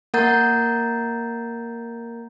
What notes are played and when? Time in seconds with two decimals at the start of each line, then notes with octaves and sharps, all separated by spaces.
0.14 A#3 A#4 F#5 A#5 G6 A6